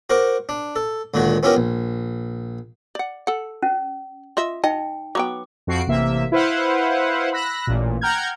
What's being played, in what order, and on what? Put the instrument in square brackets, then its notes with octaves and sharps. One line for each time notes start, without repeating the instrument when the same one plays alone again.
[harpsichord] F#4 A#4 C5 D6
D4
A4
C#2 A#2 D3 D#3 F#4
B3 C#4 E4 F4 G4 A#4
A#1
[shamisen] D5 F#5
A4 F#5
[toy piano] C#4
[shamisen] F4 D#5 E5
[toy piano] D#4 G5 [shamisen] D#5
[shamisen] F#3 B3 G5 [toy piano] D6
[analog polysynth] F2 F#4 C7 D7
A1 C3 A#3 E5
E4 B4 C5 F5 F#5
B5 E6 F#6 A#6
A1 A#2
F#5 G5 A#5 F6 G6 G#6